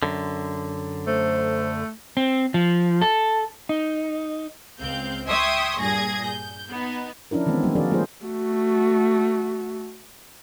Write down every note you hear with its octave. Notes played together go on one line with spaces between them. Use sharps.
F#2 D3
A3 C5
C4
F3
A4
D#4
C#2 C4 F5 G6
E5 G5 C6 C#6 D#6 G#6
G2 A#2 G#4 G#6 A#6
G6
B3 D#4
F3 C#4 D4 E4 A#4
D#3 E3 G#3 B3 C4
F#3 G3 A#3 F#4
D#3 F3 D4 G#4 A#4 D5
F#3 A3 A#3 F4 G#4 C5
A3 F#4